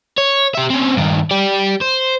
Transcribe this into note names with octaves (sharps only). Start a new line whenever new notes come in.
C#5
G4 E5
C4 C#4
G2 D#3
G4 D5
C5